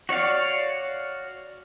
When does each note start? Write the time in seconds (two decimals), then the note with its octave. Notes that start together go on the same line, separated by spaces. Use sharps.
0.09 F#4 C#5 D5 F5